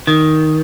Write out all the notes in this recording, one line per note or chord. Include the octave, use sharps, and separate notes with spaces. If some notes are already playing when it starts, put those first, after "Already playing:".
D#3